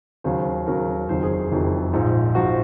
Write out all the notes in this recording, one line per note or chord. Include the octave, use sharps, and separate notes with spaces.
D#2 C#3 F#3 C5
D#2 C#3 F#3 A#4
F#1 F2 D#3 F#3 C5
G#4
F#1 F2 D#3 F#3
A#1 G#2 F3
A#1 G#2 F3 F#4